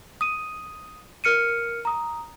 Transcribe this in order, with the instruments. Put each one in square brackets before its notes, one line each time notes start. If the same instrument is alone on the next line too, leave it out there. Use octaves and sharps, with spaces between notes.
[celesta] D#6 D#7
A#4 F6 C#7 D#7
A#5 D#6